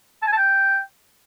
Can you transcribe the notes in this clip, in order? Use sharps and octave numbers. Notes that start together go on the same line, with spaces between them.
A5
G#5
A5
G5